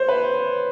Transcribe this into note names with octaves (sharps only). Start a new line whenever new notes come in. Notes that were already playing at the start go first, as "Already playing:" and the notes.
Already playing: C5 C#5
B4